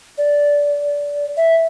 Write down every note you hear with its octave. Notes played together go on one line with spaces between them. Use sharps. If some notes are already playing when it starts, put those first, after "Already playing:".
D5
E5